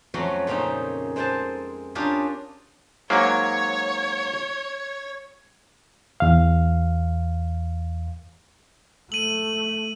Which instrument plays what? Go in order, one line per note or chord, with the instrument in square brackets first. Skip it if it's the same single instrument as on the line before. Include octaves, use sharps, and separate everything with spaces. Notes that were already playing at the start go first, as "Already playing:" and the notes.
[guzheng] F2 F#3 A3 C#4 F#5 C6
A#2 C#3 C4 C#4 D#4
G#3 C4 C5 G#5 A5
C#4 D4 F4 G4 G#4 A#4
[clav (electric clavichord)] G#2 F#3 A#3 [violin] C#5 G#6
[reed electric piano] E2 F5
[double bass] A3 [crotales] D#7 F#7